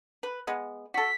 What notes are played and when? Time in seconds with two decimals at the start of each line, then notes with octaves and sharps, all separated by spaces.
0.23 B4
0.47 G#3 B3
0.94 F#4 A4 B6